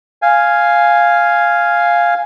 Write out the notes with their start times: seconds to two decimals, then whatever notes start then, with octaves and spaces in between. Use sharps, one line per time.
0.22 F5 G#5